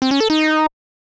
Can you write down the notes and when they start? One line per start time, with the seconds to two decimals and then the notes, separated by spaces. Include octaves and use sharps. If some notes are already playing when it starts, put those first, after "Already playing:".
0.02 C4
0.11 C#4
0.20 A4
0.30 D#4